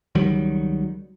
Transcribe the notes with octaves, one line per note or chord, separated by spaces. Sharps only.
C#2 D#3 F#3 G3